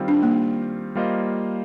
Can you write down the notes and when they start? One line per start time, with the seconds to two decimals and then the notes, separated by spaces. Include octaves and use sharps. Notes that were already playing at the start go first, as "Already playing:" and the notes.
Already playing: D#3 G3 C4 F4
0.08 D4
0.23 A#3
0.95 G3 A#3 F4 C5 D#5